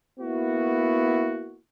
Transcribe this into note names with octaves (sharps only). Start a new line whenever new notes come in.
A#3 B3 E4 F#4